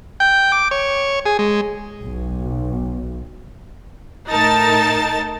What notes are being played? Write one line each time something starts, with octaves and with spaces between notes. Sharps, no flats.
G5
D6
C#5
G#4
G#3
B1
A2 D#4 A#4 A5 A6